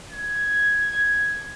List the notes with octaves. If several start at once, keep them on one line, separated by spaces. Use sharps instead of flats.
G#6